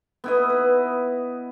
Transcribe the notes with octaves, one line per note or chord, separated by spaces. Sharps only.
B3 E4 D#5
B4